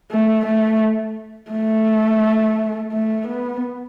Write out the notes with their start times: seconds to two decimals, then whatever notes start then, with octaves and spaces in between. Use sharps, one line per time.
0.11 A3
0.46 A3
1.51 A3
2.92 A3
3.28 B3